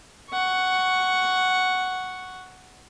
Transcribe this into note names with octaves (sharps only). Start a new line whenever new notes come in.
F#5 C#6